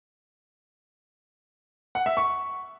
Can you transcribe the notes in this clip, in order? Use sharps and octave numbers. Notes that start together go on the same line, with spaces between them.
F#5
E5
C#6